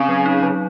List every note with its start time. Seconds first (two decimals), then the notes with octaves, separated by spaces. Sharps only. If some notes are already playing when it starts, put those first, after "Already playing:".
Already playing: C#3 C4
0.09 F#3
0.26 D#4
0.43 F#3